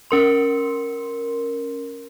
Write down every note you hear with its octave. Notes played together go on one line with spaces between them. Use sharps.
C#4 A#4 C6